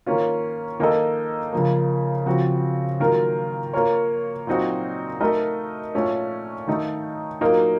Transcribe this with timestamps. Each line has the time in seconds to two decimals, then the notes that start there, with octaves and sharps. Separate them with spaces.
0.06 D#3 A#3 C#4 F4
0.79 D#3 A#3 D#4 A4 D#5
1.53 C#3 F3 A#3
2.26 C#3 F3 C4 F#4
3.00 D#3 F#3 A#3 F4 A#4
3.73 A#3 F4 A#4 C#5
4.47 A#2 F#3 C4 D#4 F#4
5.20 A3 D#4 A#4 D#5
5.95 A#2 A3 C#4
6.67 D#3 A3 D#4
7.40 A#2 F#3 A#3 D#4 A#4